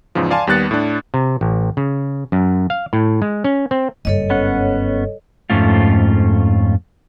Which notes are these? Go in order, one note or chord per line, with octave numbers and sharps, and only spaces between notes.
E2 G#2 C#3 F3
D5 F5 G#5 A5 C6
D#2 G3 B3 F#6 A6 C#7
A2 D4
C3
A1
C#3
F#2
F5
A2
G#3
C#4
C4
F#1 G2 A4 C#5 D#5
B3 C#4 F#5
F2 G#2 A3 C#4 F4